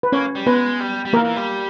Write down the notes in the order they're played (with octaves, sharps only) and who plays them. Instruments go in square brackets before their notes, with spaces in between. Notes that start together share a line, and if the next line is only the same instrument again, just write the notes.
[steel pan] B4
[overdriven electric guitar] A#3 [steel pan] C#4 C#5
[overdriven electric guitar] G3
[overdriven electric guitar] G#3 [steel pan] B3 B4
[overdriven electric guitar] G3
G3
[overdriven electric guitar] E3 [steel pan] A#3 A#4
[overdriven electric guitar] E3
G3